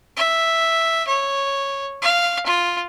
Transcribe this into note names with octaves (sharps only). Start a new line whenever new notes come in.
E5
C#5
F5
F4